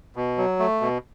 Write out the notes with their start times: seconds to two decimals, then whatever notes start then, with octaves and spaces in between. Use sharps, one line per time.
0.16 B2
0.38 F#3
0.59 A3
0.81 B2